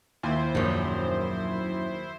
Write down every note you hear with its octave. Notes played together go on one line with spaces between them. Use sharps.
D#2 E4 F4 C5
A#1 F#2 D#3